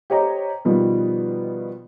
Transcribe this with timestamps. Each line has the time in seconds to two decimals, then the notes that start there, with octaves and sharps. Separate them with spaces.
0.10 G4 C5 C#5 D#5 G5 A#5
0.65 B2 D#3 F3 G3 B3